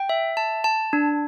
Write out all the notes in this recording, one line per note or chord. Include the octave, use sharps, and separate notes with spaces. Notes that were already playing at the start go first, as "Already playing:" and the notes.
Already playing: G5
E5
A5
A5
D4